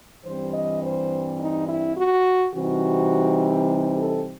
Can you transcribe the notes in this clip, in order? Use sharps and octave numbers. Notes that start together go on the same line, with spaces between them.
G2 E3 G3 C4 C5
D#5
C5
D#4
E4
F#4
C3 E3 G3 C4 D#4 F#4
G4
A4